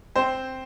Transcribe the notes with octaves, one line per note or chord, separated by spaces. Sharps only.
C4 C5